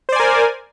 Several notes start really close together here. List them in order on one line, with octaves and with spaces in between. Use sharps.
C5 D5 G#5 A#4